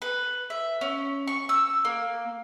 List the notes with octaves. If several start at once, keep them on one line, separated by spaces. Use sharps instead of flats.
B4
E5
C#4
C#6
E6
A#3